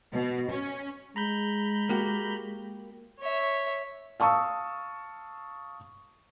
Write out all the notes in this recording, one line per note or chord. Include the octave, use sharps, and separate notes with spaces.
B2
C#4
G#3 A#5 B5 G6
A#3 F#4 G4
C#5 E5
F5 A5 C#6 D#6 E6